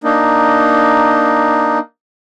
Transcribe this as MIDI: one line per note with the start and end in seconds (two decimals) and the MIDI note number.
0.04 1.79 58
0.04 1.79 62
0.04 1.79 63